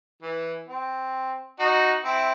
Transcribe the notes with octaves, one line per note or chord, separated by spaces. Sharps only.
E3
C4
D#4 F#4
C4 E4